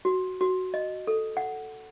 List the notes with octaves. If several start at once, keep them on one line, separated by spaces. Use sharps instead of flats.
F#4
F#4
D#5
A4
F#5